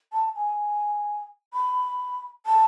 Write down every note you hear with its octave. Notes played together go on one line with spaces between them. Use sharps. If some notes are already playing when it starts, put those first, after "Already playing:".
A5
G#5
B5
A5